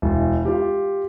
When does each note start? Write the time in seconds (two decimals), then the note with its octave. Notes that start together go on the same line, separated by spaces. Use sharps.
0.02 E1
0.45 F4 G4